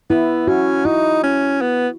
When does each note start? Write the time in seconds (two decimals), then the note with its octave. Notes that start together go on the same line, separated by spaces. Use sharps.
0.10 B3 E4
0.48 C#4 F#4
0.85 D#4 E4
1.23 C#4
1.61 B3